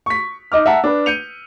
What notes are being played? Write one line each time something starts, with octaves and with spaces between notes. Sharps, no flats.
C#6 B6
D#4 D#5 D6 F6
E5 F#5 A5 A#5 E6
D4 B4
G6 C#7 D#7 F7